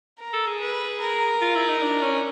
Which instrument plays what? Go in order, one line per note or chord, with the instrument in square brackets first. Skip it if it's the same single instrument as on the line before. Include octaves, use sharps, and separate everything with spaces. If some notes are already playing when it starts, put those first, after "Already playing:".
[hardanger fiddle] A#4
[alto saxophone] A4
G#4
[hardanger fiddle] B4
A#4
[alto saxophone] F4
E4
D#4
D4
C#4